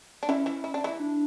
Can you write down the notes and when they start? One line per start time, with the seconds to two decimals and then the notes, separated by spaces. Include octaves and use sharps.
0.23 D4
0.28 E3 C#4 E4
0.46 E3 E4
0.64 E4
0.74 D4
0.84 E3 E4
1.00 D4